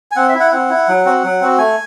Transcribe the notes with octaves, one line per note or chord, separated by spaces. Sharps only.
G#5
C4 F#5
E5
E4
F#5
C4 F#5
E4
F#3
C4 F#4
F#3
C4 F#4
A3 G#5